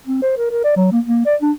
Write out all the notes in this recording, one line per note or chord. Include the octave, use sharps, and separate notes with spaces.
C4
C5
A#4
A#4
D5
F#3
A#3
A#3
D5
D4